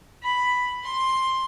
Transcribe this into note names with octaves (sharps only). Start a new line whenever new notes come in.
B5
C6